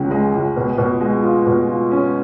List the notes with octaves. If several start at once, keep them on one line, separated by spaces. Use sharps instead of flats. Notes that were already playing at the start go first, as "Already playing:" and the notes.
Already playing: C#2 C#3 G#3 C#4
G#3
C#2
B2
B2
G#3
F4
B2
F4
C#4